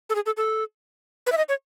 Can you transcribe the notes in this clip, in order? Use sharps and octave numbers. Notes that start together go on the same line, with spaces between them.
A4
G#4
A4
A4
B4
E5
D#5
C#5